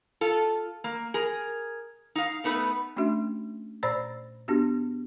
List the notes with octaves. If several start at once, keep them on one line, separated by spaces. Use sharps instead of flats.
F4 A4
A#3
G#4 A#4
D#4 F5
A3 B3 D#4 B4
A3 C#4 D4 F#4 E5
A#2 C5 D5 B5 E6 A6
B3 D4 F#4 G4